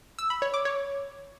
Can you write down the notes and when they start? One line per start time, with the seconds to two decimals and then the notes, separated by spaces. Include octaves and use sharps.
0.19 E6
0.30 B5
0.42 C#5
0.54 D6
0.65 C#5